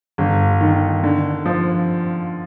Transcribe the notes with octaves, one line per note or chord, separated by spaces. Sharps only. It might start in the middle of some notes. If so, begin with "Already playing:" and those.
G1
D#3
D3
F3